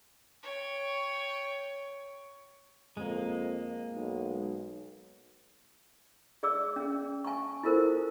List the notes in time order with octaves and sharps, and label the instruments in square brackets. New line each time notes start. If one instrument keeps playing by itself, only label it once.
[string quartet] C#5 G5
[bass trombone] F2 [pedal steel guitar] G#3 A#3
[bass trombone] B1
[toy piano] G#4 D5 D6 E6
C#4 G#4
G#5 A5 C#6
E4 F4 A4 A#4 C5